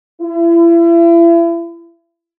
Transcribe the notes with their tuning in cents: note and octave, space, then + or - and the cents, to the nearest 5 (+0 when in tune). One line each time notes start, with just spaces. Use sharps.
E4 +35